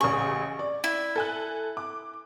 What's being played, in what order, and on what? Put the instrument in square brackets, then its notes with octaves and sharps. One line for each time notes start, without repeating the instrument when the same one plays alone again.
[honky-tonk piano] A1 C#3 G#4 [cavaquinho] C#6
[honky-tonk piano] D5
[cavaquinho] E4
[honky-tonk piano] A4 G#5 F#6
D6